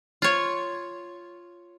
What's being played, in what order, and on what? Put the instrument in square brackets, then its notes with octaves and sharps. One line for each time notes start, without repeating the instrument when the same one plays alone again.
[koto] F4 C#5